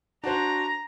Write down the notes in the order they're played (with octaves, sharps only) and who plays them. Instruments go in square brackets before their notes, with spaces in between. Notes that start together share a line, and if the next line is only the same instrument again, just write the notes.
[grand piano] D4 F#4 C5 [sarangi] A#5